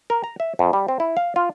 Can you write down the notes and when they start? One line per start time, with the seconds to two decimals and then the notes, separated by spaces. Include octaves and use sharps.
0.10 A#4
0.24 A#5
0.40 E5
0.59 F2
0.73 G3
0.88 C4
1.00 E4
1.17 F5
1.36 F4